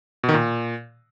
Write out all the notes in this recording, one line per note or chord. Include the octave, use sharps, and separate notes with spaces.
B2
D#3
A#2